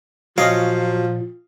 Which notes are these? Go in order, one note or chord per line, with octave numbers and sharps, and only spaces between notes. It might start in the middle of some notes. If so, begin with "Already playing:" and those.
A#2 F3 F#3 C#4 D#5 F5